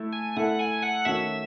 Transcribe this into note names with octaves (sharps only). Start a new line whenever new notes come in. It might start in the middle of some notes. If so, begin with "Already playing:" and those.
Already playing: A3 E4 A4
G#5
A3 E4 A4 E5 F#5
G#5
F#5
D#3 A3 C#4 F#4 E5